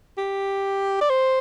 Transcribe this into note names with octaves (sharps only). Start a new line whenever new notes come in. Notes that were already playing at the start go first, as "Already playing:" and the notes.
G4
D5
C5